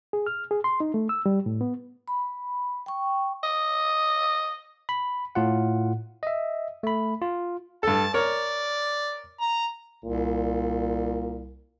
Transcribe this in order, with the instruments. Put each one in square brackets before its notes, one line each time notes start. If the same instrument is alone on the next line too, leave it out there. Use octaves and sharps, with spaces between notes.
[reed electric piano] G#4
F6
G#4
C6
D#4
A3
E6
G3
A2
B3
[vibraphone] B5
G5 C#6
[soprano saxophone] D#5
[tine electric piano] B5
A2 F4 F#5
D#5 E5
A3 B5
F4
[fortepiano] G2 A4 [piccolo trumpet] A5
[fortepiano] A#4 C#5 [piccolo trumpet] D5
[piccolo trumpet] A#5
[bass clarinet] C2 [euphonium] A#2